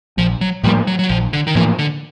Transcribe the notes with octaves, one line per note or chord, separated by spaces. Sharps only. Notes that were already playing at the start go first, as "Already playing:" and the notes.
A#1 F3
F#3
A2 F3 G3 A#3
F#3
F#3
A#1 F3
D3
D#3
A2 E3 F3 A#3
D3